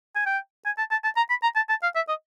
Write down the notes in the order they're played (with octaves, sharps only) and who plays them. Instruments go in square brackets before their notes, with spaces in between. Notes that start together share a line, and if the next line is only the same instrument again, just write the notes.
[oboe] G#5
G5
G#5
A5
A5
A5
A#5
B5
A#5
A5
A5
F5
E5
D#5